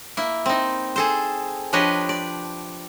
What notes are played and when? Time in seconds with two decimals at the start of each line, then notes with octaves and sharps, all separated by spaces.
0.17 A#3 E4
0.46 C4 D#4
0.96 G#4 A4 C5
1.73 F3 D4 G4 B4 C#5 D#5
2.09 D5